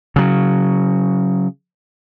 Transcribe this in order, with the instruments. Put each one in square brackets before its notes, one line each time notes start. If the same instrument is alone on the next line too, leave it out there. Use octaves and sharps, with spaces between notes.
[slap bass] C#3 F#3